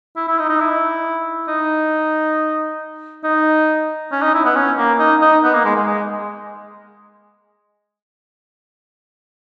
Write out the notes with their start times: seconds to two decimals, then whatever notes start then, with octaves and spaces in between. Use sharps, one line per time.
0.17 E4
0.28 E4
0.39 D#4
0.50 D#4
0.60 E4
1.48 D#4
3.24 D#4
4.12 C#4
4.22 D#4
4.34 E4
4.45 B3
4.56 C#4
4.78 A#3
4.99 D#4
5.22 D#4
5.44 B3
5.54 A#3
5.65 G#3
5.76 G#3
5.87 G#3